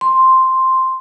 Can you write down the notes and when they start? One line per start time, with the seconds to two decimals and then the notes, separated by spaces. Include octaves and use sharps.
0.01 C6